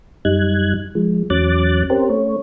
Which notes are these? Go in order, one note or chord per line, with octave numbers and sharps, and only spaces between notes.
F#2 G3 D#4 F#6 G#6
F3 G#3
E2 F#3 C#4 D6 F#6 A6
C4 C#4 G4 A#4 C5
A3 C#4 C#5